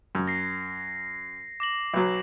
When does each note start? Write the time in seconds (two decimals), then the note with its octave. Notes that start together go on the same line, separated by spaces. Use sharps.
0.15 F#2
0.28 A#6 C7
1.60 D6 A#6 F#7
1.94 B1 F#3